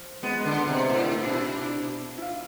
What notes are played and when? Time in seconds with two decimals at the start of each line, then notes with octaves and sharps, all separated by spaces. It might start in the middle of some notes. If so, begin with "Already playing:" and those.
Already playing: F3
0.23 G#3 B3
0.40 G#3
0.45 D3
0.57 B3
0.68 C3
0.73 C4
0.89 A2 D4
1.11 E4
1.23 B2 D4
1.33 E4
1.56 D4
2.18 E4
2.22 F4